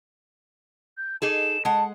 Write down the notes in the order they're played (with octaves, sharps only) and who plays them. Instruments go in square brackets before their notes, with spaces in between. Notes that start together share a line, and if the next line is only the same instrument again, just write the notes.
[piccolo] G6
[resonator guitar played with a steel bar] D#4 G#4 A4 [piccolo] E7
[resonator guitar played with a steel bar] G#3 F#5 [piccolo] A5